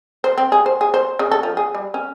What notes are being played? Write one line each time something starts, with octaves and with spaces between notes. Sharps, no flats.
C5
C4
G#4
C5
G#4
C5
C#3
A4
F3
G#4
G3
C#4